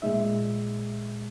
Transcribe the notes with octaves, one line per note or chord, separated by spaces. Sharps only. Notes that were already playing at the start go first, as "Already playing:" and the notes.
A#2 G#3 D#4 E5